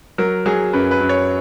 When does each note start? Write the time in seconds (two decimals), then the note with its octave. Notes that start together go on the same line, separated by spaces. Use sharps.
0.18 F#3 A#4
0.46 F#3 G#4
0.73 F#2 B4
0.91 B4
1.00 F#2
1.09 C#5